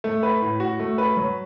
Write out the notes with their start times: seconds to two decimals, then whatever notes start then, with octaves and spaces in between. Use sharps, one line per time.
0.04 A3
0.23 B4
0.41 A2
0.60 F#4
0.80 A3
0.98 B4
1.17 F#3